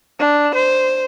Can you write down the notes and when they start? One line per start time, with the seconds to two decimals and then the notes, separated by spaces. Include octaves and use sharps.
0.19 D4
0.55 C5